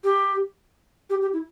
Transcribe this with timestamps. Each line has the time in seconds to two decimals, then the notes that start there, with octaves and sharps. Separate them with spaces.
0.04 G4
1.10 G4
1.21 G4
1.33 E4